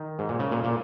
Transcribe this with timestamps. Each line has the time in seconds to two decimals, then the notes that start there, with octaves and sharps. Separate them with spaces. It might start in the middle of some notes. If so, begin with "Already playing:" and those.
Already playing: D#3
0.19 G#2
0.29 A#2
0.40 C#3
0.51 A#2
0.64 A#2